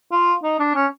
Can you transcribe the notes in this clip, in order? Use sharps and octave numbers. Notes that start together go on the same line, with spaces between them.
F4
D#4
D4
C#4